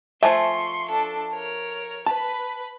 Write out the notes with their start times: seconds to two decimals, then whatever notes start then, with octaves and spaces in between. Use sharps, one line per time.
0.23 F3 A3 E5 G#5 C6 C#6
0.89 D4 A4
1.33 A#4 C#5
2.07 B4 A5 B5